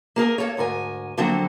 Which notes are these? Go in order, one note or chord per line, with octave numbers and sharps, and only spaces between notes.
A#3 G#4 A#4 G#5
A#3 A4 C#5
D2 G#2 A#4 G#5
D3 F3 F#3 A#3 C4 A4